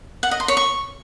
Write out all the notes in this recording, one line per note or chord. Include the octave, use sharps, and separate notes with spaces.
F#5
D#5
C6
C#5
C#6